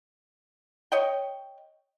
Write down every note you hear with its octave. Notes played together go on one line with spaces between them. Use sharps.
C#5 D#5 G5